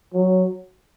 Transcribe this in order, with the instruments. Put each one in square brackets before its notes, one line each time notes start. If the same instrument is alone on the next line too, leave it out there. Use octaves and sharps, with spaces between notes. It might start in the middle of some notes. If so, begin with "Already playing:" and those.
[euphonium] F#3